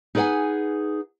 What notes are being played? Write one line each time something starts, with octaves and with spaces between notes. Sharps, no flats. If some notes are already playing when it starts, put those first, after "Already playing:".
D#4 G#4 B4 C#5 F#5 G#5